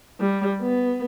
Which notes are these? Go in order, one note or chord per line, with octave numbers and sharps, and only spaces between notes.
G3
B3